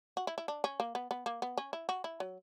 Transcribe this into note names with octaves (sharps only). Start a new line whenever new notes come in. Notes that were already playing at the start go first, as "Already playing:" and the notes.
F#4
E4
E4
D4
C#4
A#3
B3
B3
A#3
B3
C#4
E4
F#4
E4
F#3